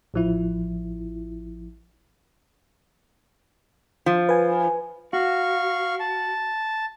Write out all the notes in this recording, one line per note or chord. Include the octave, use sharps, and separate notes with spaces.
A1 F3 E4
F3
B4 G#5
F#4 F5 C#6
A5